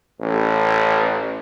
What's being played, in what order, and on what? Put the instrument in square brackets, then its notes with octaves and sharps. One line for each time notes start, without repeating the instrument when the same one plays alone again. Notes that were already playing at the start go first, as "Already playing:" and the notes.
[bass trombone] A1